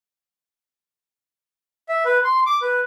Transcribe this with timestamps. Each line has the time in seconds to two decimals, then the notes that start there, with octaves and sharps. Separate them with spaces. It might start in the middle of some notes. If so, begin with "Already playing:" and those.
1.89 E5
2.05 B4
2.24 C6
2.46 D6
2.62 B4